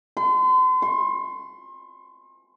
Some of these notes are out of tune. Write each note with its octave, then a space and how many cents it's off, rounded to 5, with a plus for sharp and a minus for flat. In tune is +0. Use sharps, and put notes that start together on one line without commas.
C6 -40
C6 +40